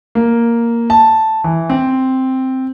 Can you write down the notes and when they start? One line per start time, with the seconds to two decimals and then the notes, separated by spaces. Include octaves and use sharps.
0.15 A#3
0.90 A5
1.44 E3
1.70 C4